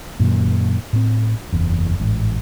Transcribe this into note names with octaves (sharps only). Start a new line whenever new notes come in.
F#2 A#2 D#3
A2 C4
F#1 E2
A1 G#2